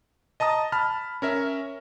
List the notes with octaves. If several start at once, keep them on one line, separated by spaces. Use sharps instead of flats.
D#5 A5 A#5 D#6
A5 B5 F6
C#4 A#4 E5